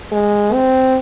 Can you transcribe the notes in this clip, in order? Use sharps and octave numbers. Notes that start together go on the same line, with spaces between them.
G#3
C4